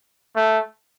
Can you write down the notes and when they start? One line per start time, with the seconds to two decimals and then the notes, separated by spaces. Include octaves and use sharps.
0.36 A3